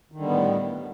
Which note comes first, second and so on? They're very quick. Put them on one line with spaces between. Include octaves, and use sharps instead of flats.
D#3 D3 G3 B3 A2